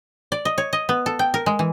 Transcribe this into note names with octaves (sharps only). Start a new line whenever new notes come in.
D5
D#5
C#5
D#5
B3
A4
G5
A#4
G#3
E3